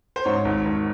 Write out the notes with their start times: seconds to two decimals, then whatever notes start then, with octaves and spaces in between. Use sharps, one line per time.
0.16 C5
0.25 G#2 C#5
0.45 G#1
0.65 G#1